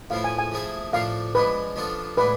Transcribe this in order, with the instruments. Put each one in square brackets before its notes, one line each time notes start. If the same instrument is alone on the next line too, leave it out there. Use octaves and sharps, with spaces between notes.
[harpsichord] A2 F3 B3 E4 [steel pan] F5
[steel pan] G#5
G#5
[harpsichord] F3 A3 E4 G#4
[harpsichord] A2 F3 A3 D4 A4 [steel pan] F5
[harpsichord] F3 G#3 D4 [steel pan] B4
[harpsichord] F3 B3 D4 F4 A4
[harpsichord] A2 G#3 D4 [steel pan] B4